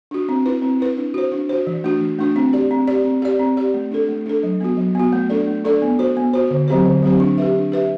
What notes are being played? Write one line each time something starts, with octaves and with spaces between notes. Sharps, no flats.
D4 F#4
C4
E4 B4
C4
E4 B4
D4
F#4 C5
D4
F#4 C5
E3
A3 D4 F#4
E3
A3 D4 F#4
C4
G4 D5
C4
G4 D5
C4
G4 D5
C4
G4 D5
A3
D4 A4
A3
D4 A4
F#3
B3 F#4
F#3
B3 F#4
A3
D4 A4 D5
A3
D4 A4 D5
B3
F#4 C5
B3
F#4 C5
D3
F#3 C4 G4 C5
D3
F#3 C4 G4 C5
D4
G4 B4 E5
D4
G4 B4 E5